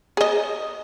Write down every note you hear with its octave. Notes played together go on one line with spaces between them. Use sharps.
G#4 D#5